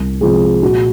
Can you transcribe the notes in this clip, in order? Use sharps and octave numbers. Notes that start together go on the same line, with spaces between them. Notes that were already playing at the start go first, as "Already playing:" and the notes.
Already playing: C2
C3 F3 G#3 G#4
A#2 F#4